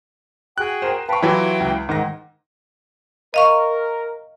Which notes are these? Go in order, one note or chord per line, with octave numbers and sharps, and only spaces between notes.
F#4 G#4 G5 F#6
A#4 C5
B4 F5 G5 A5 C#6
E3 F#3 E4 F4 G4 G5
C#2
G#2 D#3 F#5 A#6
A#4 D#5 F5 C#6